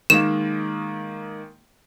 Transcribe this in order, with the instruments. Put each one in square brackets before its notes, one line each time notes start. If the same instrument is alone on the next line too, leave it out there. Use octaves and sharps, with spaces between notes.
[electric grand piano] D#3 G#3 A#3 [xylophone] E7